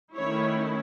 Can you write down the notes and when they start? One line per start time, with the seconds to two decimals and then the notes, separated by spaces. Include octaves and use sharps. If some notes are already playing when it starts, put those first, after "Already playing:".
0.14 D#3 A3 C#4 E4 C#5